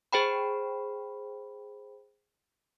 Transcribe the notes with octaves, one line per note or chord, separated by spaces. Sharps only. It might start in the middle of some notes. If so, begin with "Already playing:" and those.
G#4 C5 G5 B5